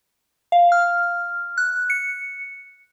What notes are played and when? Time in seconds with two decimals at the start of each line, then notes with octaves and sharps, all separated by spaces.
0.52 F5
0.72 F6
1.58 F#6
1.90 C#7